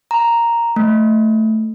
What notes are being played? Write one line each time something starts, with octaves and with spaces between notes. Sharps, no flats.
A#5
A3